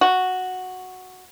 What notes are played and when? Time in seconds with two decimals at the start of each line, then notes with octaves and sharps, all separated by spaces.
0.01 F#4